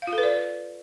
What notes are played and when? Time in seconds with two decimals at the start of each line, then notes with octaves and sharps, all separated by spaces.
0.02 F5
0.07 F4
0.13 A4
0.18 B4
0.23 D5